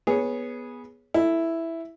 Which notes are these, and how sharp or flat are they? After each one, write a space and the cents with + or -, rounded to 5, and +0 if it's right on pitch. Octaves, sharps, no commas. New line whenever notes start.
B3 -15 G#4 -5 C#5 +0
E4 +0 A4 +5